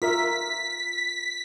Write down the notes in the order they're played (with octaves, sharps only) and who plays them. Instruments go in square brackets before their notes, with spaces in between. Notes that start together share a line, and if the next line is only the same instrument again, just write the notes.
[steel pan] F4 A#4 E5 [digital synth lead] B6